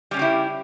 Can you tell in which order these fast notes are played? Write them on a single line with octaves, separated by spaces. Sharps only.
G3 C#4 C#3 G4 E4